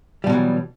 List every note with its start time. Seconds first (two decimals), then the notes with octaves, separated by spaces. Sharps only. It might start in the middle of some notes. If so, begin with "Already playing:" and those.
0.24 G3
0.27 B2
0.30 F#3
0.32 E3